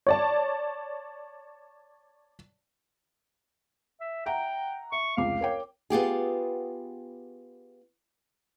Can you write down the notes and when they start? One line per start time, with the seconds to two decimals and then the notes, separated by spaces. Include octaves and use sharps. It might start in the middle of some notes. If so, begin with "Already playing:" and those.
0.07 C#5 D5 A5
4.01 E5
4.26 E5 F#5 G5 A#5
4.92 E5 C#6
5.17 F1 C#2 F5 D6
5.41 A#4 C#5 G5
5.90 B3 F4 G4 G#4